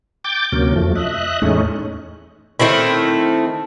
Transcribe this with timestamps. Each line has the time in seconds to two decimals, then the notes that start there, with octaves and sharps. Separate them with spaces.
0.24 G5 D6 G6 A6
0.52 D2 C3 F#3 A#3 C#4
0.76 F2 F3 A3
0.95 D#5 E5 F#6
1.42 E2 A2 G#3 A3 C#4 D#4
2.60 D#3 A3 C4 E4